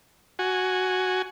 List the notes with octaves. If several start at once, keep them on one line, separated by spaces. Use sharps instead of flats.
F#4 G#5